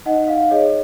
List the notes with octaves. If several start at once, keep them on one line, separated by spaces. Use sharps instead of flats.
D#4 D#5 F#5
F5
G#4 C#5 D#5